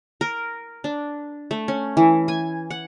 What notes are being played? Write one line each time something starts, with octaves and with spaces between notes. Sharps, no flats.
A#4
D4
A3
C#4
E3
G#5
F#5